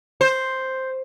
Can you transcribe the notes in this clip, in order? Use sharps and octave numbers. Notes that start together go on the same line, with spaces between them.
C5